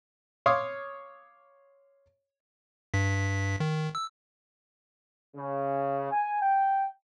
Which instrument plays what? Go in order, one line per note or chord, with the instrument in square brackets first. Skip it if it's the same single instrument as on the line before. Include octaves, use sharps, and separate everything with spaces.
[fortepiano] C#5 F5 C6 D6 D#6
[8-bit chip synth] G2 B6
D#3
E6
[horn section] C#3
G#5
G5